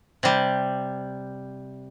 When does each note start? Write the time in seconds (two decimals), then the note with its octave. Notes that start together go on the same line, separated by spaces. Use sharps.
0.23 C3 G3